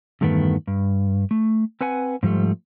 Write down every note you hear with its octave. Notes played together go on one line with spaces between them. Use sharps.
E2 G2 D#3 A3 B3
G2
A3
C4 B4 F#5 G#5
G#2 F3 G3 A3